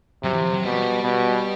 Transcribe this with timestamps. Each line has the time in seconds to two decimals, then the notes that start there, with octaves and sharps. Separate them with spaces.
0.23 C3 F#3
0.33 E3
0.44 F3
0.54 F#3
0.63 B2 G3
1.03 B2